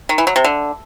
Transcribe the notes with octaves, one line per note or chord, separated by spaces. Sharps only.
D#3
E3
F#3
C3
D3